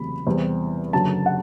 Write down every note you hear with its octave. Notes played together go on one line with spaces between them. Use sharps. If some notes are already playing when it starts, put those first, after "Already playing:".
Already playing: F#1 E2 C3 F#3 A3 B5
E2 C3 G3 C4
F#1 F#2 D3 F#3 A5
F#5